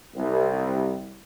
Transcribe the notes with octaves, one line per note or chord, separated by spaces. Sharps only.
C2